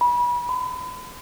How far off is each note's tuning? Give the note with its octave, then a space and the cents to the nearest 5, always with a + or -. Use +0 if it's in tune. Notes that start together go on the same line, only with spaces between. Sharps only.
B5 -30
B5 +40